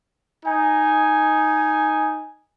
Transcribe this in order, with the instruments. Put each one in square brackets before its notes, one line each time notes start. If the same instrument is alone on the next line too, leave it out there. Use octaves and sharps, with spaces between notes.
[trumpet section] D#4 G#5